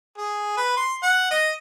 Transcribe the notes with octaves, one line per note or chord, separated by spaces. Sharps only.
G#4
B4
C6
F#5
D#5